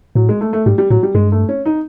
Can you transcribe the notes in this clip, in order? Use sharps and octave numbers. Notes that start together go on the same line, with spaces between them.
A2 F#3
G#3
A3
A3
G#2 G3
G3
A2 F#3
G3
G2 G#3
A3
C#4
D#4